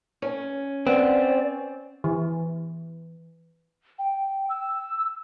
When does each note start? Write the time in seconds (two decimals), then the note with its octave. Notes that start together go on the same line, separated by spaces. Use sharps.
0.22 C#4
0.87 C4 B4 C5 D5 F#5
2.04 E3
3.99 G5
4.50 E6